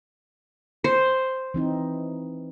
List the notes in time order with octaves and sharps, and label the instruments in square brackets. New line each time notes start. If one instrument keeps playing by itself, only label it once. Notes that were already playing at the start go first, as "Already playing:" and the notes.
[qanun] C5
[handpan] E3 C4 D#4